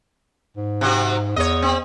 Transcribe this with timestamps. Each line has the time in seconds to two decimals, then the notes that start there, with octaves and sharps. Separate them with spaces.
0.57 G#2
0.81 C3 F#3 F#4
1.36 E2 C#5 D#5
1.62 C4